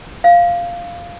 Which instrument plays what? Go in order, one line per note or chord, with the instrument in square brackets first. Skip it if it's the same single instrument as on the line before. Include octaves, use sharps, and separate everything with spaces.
[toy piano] F5